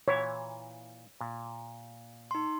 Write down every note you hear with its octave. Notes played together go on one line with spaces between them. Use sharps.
A#2 E3 E4 C#5
A#2
D#4 C6